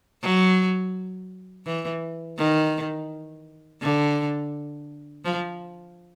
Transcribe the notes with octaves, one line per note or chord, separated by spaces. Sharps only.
F#3
E3
D#3
D3
F3